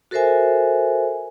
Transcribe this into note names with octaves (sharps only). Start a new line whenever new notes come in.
F#4 A4 A#4 C5 E5 G#5